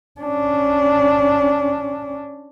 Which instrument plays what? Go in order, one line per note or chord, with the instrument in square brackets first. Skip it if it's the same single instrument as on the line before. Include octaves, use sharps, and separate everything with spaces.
[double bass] C#4 D4